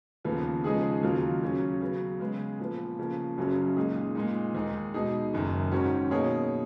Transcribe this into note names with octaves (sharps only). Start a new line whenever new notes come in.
D#2 C#3 F3 B3
C#3 F3 G#3 D#4 G#4
D#2 C#3 F#3 A#3 F4
C#3 F#3 C#4
C#3 F#3 B3
C#3 G#3 B3
A#2 F3 B3
C#3 F3 A#3
F#1 F#2 C#3 F#3 C#4
A#2 G#3 D#4 G#4
A#2 G#3 D#4
D#2 D#3 G#3 D#4
B2 G#3 D#4 G#4
F#1 F#2 D#3
G#2 D#3 F#3 C#4 F#4
B2 A#3 D#4 G#4 C#5